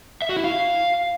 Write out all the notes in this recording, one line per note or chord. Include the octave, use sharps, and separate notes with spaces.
E5
F#4
E4
F5